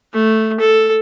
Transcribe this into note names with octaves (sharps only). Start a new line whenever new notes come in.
A3
A4